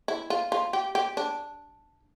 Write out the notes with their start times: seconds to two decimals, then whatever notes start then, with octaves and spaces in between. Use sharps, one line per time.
0.08 E4
0.30 F4
0.52 F4
0.73 G4
0.95 G4
1.17 D4